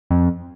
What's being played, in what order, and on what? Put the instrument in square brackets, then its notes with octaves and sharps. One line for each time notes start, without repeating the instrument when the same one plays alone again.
[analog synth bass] F2